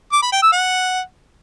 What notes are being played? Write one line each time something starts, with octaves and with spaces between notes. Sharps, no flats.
D6
B5
G5
E6
F#5